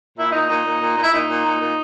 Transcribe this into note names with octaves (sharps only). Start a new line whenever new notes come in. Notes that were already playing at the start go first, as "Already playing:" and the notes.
A#2 E4
A#2 D#4
A#2 D#4
A#2
A#2
A#2
E4
A#2 D#4
A#2
A#2
A#2